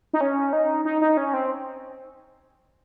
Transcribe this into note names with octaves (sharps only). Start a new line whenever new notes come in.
D#4
C#4
D#4
D#4
D#4
C#4
C4